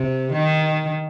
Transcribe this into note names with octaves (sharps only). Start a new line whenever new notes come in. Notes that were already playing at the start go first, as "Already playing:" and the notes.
Already playing: C3
D#3